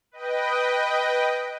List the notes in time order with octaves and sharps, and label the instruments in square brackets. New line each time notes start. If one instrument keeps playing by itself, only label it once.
[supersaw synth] B4 D#5 G5